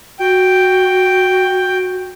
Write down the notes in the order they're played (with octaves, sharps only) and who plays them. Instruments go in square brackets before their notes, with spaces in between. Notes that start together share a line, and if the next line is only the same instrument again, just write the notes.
[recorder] F#4 [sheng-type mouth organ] G5